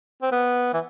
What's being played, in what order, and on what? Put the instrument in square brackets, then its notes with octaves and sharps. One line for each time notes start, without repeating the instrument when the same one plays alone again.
[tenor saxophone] C4
B3
E3